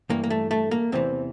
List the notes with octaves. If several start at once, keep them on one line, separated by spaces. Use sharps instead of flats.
G2 E3 A#3
A#3
A3
A3
A#3
E2 C3 E3 C4